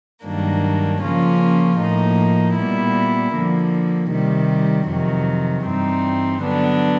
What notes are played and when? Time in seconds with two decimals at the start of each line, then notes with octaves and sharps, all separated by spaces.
0.24 G2 D#3 F#3 A#3 D4
1.02 C#3 F3 A#3 C#4 F4
1.78 A2 F3 A#3 D#4
2.55 A#2 G3 B3 E4
3.33 D3 F3 A#3
4.10 C3 D#3 G3
4.87 F2 C3 D#3 F#3
5.64 G2 E3 G3 C4 D#4
6.41 D3 F#3 B3 D4